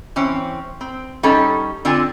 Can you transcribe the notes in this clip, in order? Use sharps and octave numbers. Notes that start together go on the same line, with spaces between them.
E3 C4 C#4
C4
G3 C#4 D#4 A4
D3 C4 D4 F4 G#5